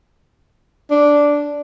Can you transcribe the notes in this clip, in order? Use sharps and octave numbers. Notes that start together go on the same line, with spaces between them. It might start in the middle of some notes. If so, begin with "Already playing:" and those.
D4